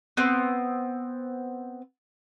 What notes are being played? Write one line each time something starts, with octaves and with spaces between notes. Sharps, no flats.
B3 C4